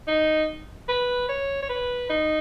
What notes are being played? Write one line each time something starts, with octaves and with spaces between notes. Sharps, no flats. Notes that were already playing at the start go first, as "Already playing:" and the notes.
D#4
B4
C#5
C#5
B4
D#4